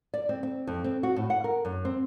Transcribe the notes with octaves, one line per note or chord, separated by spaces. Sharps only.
D5
C4
C4
F2
C4
F#4
A2
F#5
A#4
F#2
C4